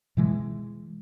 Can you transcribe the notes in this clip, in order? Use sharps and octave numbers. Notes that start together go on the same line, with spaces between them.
B2 E3 G#3